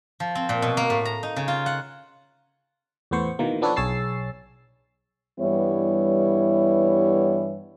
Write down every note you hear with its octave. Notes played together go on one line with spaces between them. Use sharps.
F3
C4
A#2
B2
A#3
A2
A#5
D#4
C#3
F4
F#5
E2 A2 B3 C5 C#6
B2 D#3 E3 A#3
F3 B3 D4 A4 B4 C#5
B1 G#4 C#5 E6 A6 C7
G2 E3 G3 B3 E4 C#5